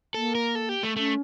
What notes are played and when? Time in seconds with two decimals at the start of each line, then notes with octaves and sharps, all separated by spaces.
0.14 A#3 A4
0.35 A#4
0.55 A4
0.69 G4
0.83 A3
0.96 A3 C#4